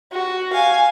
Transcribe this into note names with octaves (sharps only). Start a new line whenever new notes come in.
F#4
F5 G#5